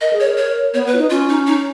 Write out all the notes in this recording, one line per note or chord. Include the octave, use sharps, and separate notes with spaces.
A#4 D#5
G#4
C#5
A#4
C#5
B3 C#5
B4
F4
D#4
C#4 F4
D#4
D#4